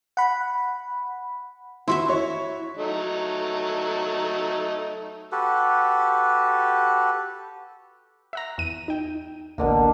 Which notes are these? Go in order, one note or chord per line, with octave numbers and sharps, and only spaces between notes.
F#5 B5
E4 F#4 E5 C6
C#5 C#6
F#3 A3 D#4
F#4 G4 A4 B4
E5 F#5 A#5
E2 D#7
D#4 G5
A1 D2 B2 D3 A#3